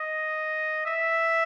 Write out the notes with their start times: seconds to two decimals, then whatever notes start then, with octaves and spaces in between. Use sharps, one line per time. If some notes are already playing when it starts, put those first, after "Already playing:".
Already playing: D#5
0.86 E5